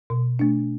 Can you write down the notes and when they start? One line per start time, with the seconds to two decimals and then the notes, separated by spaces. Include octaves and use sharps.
0.10 B2
0.39 A3 D4